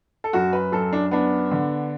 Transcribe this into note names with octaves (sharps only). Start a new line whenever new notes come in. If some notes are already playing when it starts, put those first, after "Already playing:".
A4
F#2 F#4
B4
F#2 A4
D4
B3 D4
D3